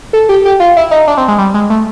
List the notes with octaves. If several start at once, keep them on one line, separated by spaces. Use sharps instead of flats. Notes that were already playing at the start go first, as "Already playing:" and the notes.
A4
G4
G4
F4
E4
D#4
D4
C4
G#3
G3
G#3
A3